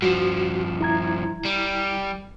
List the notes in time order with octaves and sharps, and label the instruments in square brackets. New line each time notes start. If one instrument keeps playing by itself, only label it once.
[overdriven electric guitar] G2 F3 [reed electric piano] F#4
[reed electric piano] E4 A#5 G#6
[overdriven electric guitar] G3